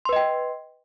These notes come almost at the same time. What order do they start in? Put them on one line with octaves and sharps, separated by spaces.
C6 B4 D#5 G5